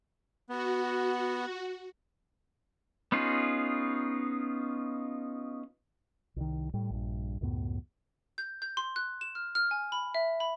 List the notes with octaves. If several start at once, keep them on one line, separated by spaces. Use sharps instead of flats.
B3 F#4
B3 C#4 D#4 F4 G#4
C2 D#3
A2 G3
A#1 G2
C#2 F#2 A2 B3
G6
G6
C6
F#6
E7
F6
F6
G#5
B5
E5
B5